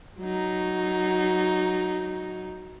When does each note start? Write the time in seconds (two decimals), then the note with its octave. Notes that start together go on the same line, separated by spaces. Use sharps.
0.20 F#3 D#4